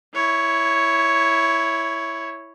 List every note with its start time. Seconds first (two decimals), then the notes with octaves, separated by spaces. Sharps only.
0.14 E4 C#5